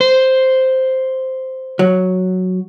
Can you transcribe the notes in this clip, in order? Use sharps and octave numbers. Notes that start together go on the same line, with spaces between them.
C5
F#3